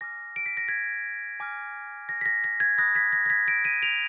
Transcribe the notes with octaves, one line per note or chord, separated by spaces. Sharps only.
G#5 D6 F6 A#6
D7
B6
A#6
G#6 B6
G#5 D6 F6
A#6
B6
A#6
A#6
G#6
B5 D#6 F#6 A#6
G#6 B6
A#6
A#6
G#6 B6
A#6 D7
B6 D#7
D7 F7